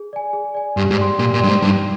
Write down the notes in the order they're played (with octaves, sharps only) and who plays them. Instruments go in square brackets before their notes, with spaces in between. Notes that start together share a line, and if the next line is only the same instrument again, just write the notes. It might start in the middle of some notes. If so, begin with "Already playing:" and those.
Already playing: [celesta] G#4
D5 G#5
G#4
D5 G#5
[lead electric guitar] G2 [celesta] G4
[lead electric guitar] G#2
[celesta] D5 G5 C6
[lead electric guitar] A#2 [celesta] G4
[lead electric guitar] A#2
[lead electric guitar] G2 [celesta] D5 G5 C6
[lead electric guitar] G#2
[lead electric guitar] G2 [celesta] D#4